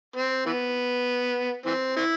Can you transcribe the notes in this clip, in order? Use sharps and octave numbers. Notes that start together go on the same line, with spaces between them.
C4
E3 B3
E3 C4
C4 E4